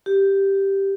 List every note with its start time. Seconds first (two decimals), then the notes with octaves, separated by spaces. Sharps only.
0.06 G4